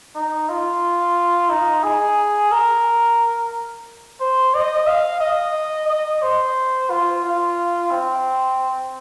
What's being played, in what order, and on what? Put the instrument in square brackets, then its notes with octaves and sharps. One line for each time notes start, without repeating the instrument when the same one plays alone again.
[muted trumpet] D#4
F4
D#4
G#4
A#4
C5
D#5
F5
D#5
D#5
C5
F4
F4
C4